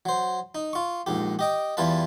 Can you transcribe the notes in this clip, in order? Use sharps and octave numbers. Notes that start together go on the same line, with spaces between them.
F#3 C5
D#4
F4 C#6
A#1 G#2 G4
G4 D#5 G5
E2 E3 G3 F4 B4 A5